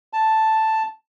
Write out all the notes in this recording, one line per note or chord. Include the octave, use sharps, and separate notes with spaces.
A5